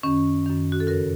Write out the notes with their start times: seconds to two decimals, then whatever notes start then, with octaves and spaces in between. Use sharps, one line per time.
0.03 F#2 D#3 C#4
0.46 F#2 D#3
0.72 F#4
0.80 A4
0.87 F2 C#3 F#4 A#4